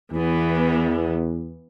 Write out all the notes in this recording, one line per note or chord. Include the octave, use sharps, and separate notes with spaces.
E2 E3 B3